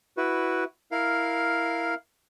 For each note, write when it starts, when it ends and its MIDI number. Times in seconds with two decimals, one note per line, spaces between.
0.17 0.64 64
0.17 0.64 66
0.17 0.64 71
0.91 1.94 64
0.91 1.94 70
0.91 1.94 77